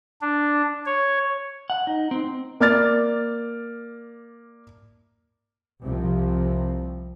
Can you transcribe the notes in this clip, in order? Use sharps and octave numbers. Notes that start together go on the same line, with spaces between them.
D4
C#5
F#5
D#4
C4
A#3 D5 F6 A6
C2 C3 F3